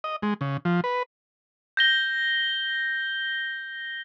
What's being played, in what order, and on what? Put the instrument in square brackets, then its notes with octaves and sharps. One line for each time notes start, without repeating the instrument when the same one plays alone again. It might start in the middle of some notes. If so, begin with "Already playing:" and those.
[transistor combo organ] D#5
G#3
C#3
F3
B4
[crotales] G6 A#6 G7